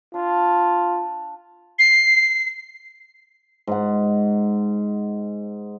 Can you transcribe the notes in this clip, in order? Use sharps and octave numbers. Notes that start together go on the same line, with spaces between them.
D4 F4
C7
G#2 F#5